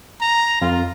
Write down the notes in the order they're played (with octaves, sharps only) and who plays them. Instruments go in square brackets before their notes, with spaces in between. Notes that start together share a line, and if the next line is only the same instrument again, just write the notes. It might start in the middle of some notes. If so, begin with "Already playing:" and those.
[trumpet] A#5
[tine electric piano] F2 [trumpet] F4